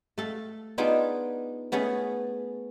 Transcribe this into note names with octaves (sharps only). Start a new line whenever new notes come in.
A3 A4 F5
B3 D4 D#4 F4 G#4
A3 B3 C#4 G#4